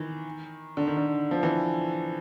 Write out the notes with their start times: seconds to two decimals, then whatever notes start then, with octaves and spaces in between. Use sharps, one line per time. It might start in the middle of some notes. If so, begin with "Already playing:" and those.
Already playing: D#3 E3
0.77 D3
0.87 D#3
0.97 D3
1.31 F3
1.43 E3